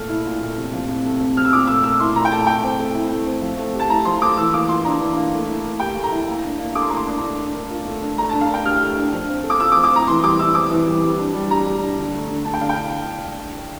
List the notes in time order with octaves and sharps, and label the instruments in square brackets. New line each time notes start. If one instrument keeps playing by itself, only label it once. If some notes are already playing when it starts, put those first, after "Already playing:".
Already playing: [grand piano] A#2 A3 A4 [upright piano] F6
[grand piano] E4
A#2
A3
C3
F3
C3
A3
C3
[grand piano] F3 [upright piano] F6
[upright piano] E6
[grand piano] A#2 [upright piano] D6
[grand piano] A3 [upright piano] E6
[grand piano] A#4 [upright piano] E6
[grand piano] E4 [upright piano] C6
[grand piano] A#2 [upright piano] A#5
[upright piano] G5
[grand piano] A3 [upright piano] A5
[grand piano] A3 [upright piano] G5
[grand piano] C4
A4
E4
A3
C4
F3
A3
G4
[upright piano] A5
[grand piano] E4 [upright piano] A#5
[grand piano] F3 [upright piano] C6
[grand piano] A3 [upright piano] D6
[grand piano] E3 [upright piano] E6
[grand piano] A#3 [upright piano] D6
[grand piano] F4 [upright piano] C6
[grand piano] D4 [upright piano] A#5
[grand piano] E3
A#3
A3
E4
A#4
[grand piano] G4 [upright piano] G5
[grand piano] A3
[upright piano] A#5
[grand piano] E4
A#3
D4
A#3
[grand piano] A4 [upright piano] D6
[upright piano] C6
[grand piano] A#3 [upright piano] A#5
[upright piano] C6
[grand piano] D4
A3
D4
A#4
F4
A3
D4
[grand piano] A3 [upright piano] A#5
[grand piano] D4 [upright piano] A5
[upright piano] F5
[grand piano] A#4 [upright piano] G5
[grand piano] G4 [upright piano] F6
[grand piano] A3
D4
F3
C4
A4
[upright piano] D6
[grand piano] F4 [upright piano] E6
[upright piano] D6
[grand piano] F3
[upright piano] D6
[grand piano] C4 [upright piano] A#5
[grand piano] E3 [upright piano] C6
[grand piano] G3 [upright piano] D6
[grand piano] E4 [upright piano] E6
[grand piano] C4 [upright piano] D6
[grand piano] E3
G3
G3
D4
G3
[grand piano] G4 [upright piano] A#5
[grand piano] G3
D4
D3
A3
D3
[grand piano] D4 [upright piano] A5
[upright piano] G5
[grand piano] D3 [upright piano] F5
[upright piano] G5